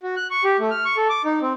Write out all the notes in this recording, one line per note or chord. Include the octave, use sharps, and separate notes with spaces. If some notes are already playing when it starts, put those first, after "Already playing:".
F#4
F#6
C#6
G4
A3
F6
C#6
A4
D6
D#4
C4